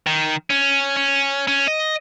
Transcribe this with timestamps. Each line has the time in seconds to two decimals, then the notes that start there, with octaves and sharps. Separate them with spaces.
0.07 D#3
0.50 C#4
0.97 C#4
1.47 C#4
1.68 D#5